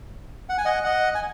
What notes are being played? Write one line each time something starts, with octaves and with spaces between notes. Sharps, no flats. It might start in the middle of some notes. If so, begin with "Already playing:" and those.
F#5
G#5
D#5 F#5
D#5 F#5
G#5